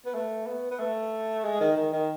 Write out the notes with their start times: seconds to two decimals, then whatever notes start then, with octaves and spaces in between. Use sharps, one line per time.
0.05 B3
0.14 A3
0.46 B3
0.71 B3
0.79 A3
1.44 G#3
1.60 D#3
1.76 D#3
1.93 D#3